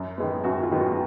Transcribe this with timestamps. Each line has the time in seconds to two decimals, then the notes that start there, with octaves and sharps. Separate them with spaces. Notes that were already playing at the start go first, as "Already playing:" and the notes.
Already playing: F#2
0.18 D#3 G#3 B3
0.44 F#2 F#4
0.63 F4
0.72 D#3 G#3 B3
0.80 F#4